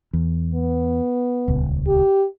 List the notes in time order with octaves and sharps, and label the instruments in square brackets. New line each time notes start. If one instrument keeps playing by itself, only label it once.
[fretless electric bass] E2
[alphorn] B3
[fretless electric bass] D#1 C#2
[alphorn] G4